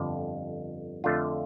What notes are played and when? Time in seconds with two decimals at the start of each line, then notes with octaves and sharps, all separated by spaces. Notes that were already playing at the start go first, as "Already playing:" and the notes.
Already playing: G1 F2 D3
1.04 F2 D3 A3 D4 F4